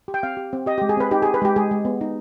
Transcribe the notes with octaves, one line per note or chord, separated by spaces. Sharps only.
G4
G5
C4 F5
G4
C4
G4 D#5
G#3 G4
G#4
C4 B4
D#4 G4
G4 G#4
B4
G#3 G4
G#3 G#4
G#3
B3
D#4